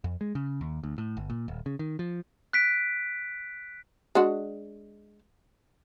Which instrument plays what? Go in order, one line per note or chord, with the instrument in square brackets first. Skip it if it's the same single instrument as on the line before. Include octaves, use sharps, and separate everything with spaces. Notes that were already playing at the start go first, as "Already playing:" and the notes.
[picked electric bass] F2
G#3
C#3
D#2
D2
A2
G1
A#2
D#1
C#3
D#3
F3
[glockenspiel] F#6 B6 D7
[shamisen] G#3 D4 F#4